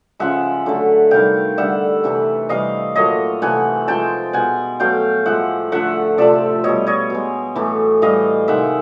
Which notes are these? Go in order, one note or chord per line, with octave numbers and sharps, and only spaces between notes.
C#3 F3 G#3 E5 F#5
D3 F#3 A3
C3 D#3 G3 F5 G5
D3 G3 E5 F#5
C3 E3 A3
C3 E3 G3 D#5 F5
A#2 F#3 A3 C#5 D#5
C3 E3 A3 F#5 G#5
C3 F3 G#3 G5 A5
B2 G#3 F#5 G#5
B2 F#3 A3 F5 G5
A2 F3 G#3 E5 F#5
D3 F3 A3 E5 F#5
C3 F3 A3 D5 E5
B2 G3 C#5 D#5
C#5 D#5
B2 G#3
A2 E3 A3
A2 E3 G3 D#5 F5
C3 D#3 G#3 E5 F#5